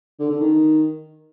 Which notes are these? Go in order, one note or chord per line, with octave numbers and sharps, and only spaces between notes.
D3
D3
D#3